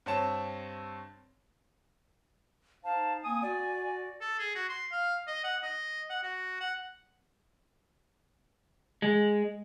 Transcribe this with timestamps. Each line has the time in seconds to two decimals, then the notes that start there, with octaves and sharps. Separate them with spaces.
0.06 G2 C4 C#5 A5 E7
2.84 D#4 C5 F5 A5
3.23 A#3 C4 G#5 D#6
3.42 F#4 D5
4.21 A4
4.39 G#4
4.55 F#4
4.69 C6
4.92 F5
5.27 D#5
5.44 F#5
5.63 D#5
6.10 F#5
6.23 F#4
6.60 F#5
9.02 G#3